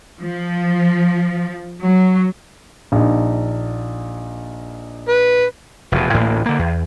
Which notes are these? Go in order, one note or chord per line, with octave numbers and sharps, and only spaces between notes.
F3
F#3
A#1 D#4
B4
F1 E2 B2
A1 D2 A2 A#3
D3 A#3
E2